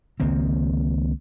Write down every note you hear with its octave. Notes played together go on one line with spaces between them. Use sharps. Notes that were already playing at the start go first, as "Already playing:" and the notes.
C#2 D#3 A#3 C4